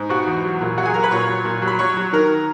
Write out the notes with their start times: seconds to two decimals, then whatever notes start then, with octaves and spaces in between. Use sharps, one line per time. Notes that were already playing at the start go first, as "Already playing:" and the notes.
Already playing: G#2
0.09 B2 F#4 F#5
0.27 E2
0.44 F#3
0.61 A#2
0.77 F#3 F#4 F#5
0.85 G#4 G#5
0.94 F#3 A#4 A#5
1.03 B4 B5
1.11 A#2 C#5 C#6
1.29 F#3
1.45 A#2
1.62 F#3
1.67 B5
1.79 F#3 C#5 C#6
1.97 F#3
2.13 D#3 A#4 A#5